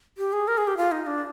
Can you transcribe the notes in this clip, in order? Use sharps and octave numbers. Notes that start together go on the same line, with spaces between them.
G4
G#4
A#4
G#4
G4
F4
D#4
D4